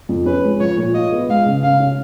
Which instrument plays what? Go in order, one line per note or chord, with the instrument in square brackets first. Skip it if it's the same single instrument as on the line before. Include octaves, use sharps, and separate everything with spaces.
[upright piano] F2
[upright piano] C#4 [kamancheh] B4
[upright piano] G#3
[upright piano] F3 [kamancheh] C#5
[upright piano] A#2
[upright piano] F4 [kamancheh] D#5
[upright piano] B3
[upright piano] G#3 [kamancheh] F5
[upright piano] C#3
[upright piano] C#3 [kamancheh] F5
[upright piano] C#4